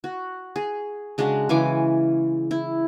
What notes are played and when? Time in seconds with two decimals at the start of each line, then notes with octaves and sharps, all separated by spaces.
0.04 F#4
0.56 G#4
1.18 C#3 G#3 D4 F#4
1.49 C#3 E3 G#5 D6
2.51 E4